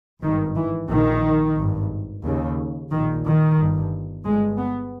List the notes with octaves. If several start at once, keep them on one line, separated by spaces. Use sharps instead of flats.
G#1 G2 D#3
E3
A#1 A#2 D#3
G#1 G2
D#2 C#3
A#1 A#2 D#3
D#3
G1 G2
G1 G2 G#3
B3